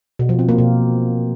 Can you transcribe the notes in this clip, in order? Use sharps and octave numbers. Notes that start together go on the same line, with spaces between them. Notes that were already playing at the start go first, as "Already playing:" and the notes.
B2
F3
C4
A#3
B2